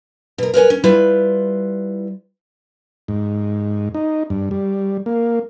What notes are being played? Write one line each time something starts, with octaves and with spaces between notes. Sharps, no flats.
B2 A#4
A#4 B4 C#5 G#5
C#4
G3 E4 F4 B4
G#2
D#4
G2
G3
A#3